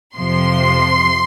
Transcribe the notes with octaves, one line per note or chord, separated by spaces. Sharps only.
F2 C3 F3 C6